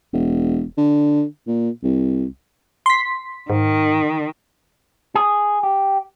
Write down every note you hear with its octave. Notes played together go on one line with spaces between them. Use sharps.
E1
D3
A#2
C2
C6 B6
G#2 D#3
G#4
G4